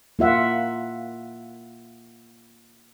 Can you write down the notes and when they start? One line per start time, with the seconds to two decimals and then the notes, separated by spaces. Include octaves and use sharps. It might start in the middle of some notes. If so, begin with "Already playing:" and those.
0.19 A#3 F4 E5 F#5